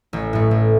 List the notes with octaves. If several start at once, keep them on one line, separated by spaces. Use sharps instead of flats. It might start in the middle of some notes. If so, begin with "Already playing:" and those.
A1
A2 A3
A1